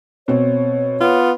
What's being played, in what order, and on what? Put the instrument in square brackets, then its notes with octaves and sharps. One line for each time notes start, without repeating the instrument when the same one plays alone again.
[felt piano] B2 C4 [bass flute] C#5
[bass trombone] B3 [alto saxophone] F4